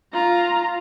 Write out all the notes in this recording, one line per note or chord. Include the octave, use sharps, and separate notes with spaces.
F4 A#5